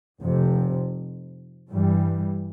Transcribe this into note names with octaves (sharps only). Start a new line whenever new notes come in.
F1 F2 C3
G2 E3 G3